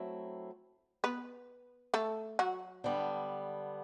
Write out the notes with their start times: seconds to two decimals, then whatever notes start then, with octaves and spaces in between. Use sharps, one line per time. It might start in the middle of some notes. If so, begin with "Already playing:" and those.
Already playing: F#3 A3 C4 E4
1.04 B3 B4
1.94 A3 A4
2.39 F#3 F#4
2.84 D3 G3 B3